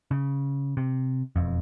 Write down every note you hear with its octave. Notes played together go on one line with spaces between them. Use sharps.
C#3
C3
E1 F2